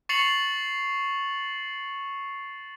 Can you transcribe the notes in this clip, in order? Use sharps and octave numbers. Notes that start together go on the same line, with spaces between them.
C#6 A6 C7 C#7 F7 F#7